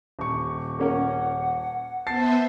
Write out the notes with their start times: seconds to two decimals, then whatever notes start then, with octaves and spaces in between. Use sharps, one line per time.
0.19 D#1 C#6
0.79 A#3 C#4 A#4 F#5
2.07 B3 C5 E5 A5 A6 C7